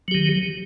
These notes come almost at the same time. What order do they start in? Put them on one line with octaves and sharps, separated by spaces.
F#3 G4 D#3